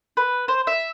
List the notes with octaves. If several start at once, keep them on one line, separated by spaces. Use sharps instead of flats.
B4
C5
E5